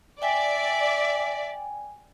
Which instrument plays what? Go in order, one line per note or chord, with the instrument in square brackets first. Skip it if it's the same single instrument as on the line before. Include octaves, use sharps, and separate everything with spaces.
[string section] D5 [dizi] E5 [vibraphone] G5 G#5